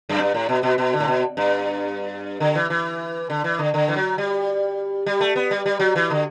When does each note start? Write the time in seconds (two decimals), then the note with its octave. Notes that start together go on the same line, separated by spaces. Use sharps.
0.09 F#2
0.18 G2
0.34 A2
0.49 B2
0.63 B2
0.78 B2
0.93 D3
1.00 A2
1.08 B2
1.37 G2
2.40 D3
2.55 E3
2.70 E3
3.30 D3
3.44 E3
3.59 D3
3.74 D3
3.88 E3
3.96 F#3
4.18 G3
5.06 G3
5.20 A3
5.36 B3
5.51 G3
5.66 G3
5.80 F#3
5.96 E3
6.10 D3